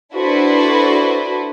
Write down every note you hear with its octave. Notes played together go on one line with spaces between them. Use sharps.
D4 E4 F#4 A4 B4 C5